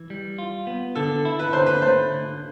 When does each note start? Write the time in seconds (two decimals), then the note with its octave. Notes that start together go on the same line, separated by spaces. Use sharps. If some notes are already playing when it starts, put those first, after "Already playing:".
Already playing: E3
0.10 G3
0.38 F4
0.67 B3
0.95 D3 A4
1.25 E4
1.39 B4
1.53 D3 C5
1.66 B4
1.82 A3 C5
2.11 D3